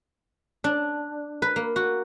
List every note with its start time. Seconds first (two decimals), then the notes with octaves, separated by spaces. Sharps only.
0.64 D4
1.42 B4
1.56 A#3
1.76 F#4